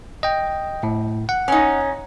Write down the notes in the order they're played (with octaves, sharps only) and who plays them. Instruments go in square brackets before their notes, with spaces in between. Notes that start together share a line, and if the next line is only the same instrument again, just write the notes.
[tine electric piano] D#5 G5
A2
F#5
[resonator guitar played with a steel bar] C#4 D#4